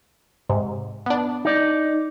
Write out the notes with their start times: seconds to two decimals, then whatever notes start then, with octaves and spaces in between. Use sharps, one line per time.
0.49 G#2 C3
1.06 B3 D4
1.45 D#4 D5